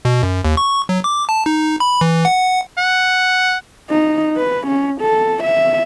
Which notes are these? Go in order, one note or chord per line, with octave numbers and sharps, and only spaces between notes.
B2
F#2
D#2
C#6
F#3
D6
A5
D#4
B5
E3
F#5
F#5
D#4
B4
C#4
A4
E5